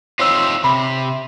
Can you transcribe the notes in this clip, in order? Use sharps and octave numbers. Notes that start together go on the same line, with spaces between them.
C4 D#4 F4 C5 C#5 E6
C3 B5